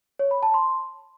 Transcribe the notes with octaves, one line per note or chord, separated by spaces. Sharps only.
C#5
B5
A5
C6